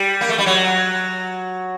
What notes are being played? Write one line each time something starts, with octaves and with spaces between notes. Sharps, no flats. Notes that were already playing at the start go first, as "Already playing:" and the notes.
Already playing: G3
A#3
A3
G3
F#3